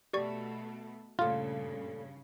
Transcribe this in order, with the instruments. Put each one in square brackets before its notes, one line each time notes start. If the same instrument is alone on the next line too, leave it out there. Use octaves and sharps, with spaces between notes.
[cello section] B2 A3 [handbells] G4 D5 C#6
[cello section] G2 C#3 [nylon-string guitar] A#2 A3 A4 [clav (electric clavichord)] F4